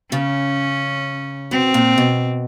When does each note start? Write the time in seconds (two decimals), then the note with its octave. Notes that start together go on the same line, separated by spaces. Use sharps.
0.12 C#3 C#4
1.51 B2 C4
1.74 A#2
1.98 B2